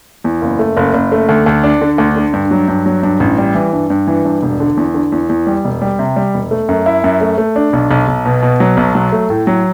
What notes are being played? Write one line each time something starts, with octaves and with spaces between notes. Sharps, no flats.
E2
F#1
A3
F#1
F#1
A3
D2
D2
D4
D3
D2
D3
G2
F#3
G2
F#3
G2
A1
G3
E3
G2
G2
E3
G2
E1
D3
E2
D3
E2
E2
G3
E1
G3
C3
G3
E1
A3
F#2
E4
F#2
A3
A3
D4
B1
B1
B1
B2
B2
F#3
B1
F#3
A3
A2
F#3